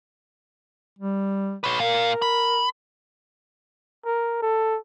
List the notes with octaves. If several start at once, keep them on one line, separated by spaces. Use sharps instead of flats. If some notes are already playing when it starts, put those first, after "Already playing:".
G3
B4 C#5
A#2 A#4 F5
B5
A#4
A4